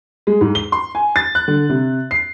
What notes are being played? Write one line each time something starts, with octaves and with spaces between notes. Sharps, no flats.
G#3
G#2
G7
C6
G#5
A6
F#6
D3
C3
C7